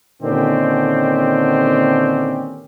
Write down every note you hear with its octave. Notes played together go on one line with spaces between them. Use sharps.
A#2 D3 D#3 C4 C#4 G4